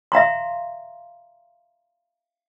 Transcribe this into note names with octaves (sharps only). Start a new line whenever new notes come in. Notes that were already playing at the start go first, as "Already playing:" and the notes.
E5 F5 A#5 C6